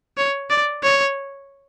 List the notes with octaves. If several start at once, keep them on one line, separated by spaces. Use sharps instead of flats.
C#5
D5
C#5